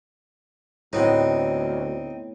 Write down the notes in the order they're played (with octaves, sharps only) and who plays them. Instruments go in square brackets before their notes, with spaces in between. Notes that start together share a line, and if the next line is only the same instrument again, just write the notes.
[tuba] D2 [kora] A2 B3 F#5 [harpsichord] C4 D#4